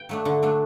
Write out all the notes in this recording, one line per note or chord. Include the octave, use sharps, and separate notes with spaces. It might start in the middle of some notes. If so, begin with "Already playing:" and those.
Already playing: G5
F#3 A3 D4
D3
F#3 A3 D4